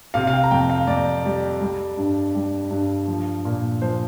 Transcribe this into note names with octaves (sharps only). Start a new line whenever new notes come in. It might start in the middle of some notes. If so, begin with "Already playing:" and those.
C3 F5
F5
G5
A#5
F2 G5
F5
F2 D5
G3
G3
G2
G3
G2
F3
A#2
F3 C5